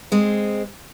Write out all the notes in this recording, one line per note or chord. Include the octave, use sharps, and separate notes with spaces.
G#3 C4